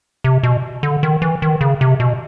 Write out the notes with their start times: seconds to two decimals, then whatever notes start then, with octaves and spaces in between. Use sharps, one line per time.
0.24 C3
0.43 B2
0.83 D3
1.03 D#3
1.22 E3
1.42 D#3
1.61 C#3
1.81 C3
2.00 B2